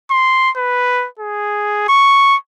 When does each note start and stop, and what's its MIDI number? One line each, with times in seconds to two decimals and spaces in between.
0.11 0.50 84
0.56 1.07 71
1.19 1.85 68
1.89 2.36 85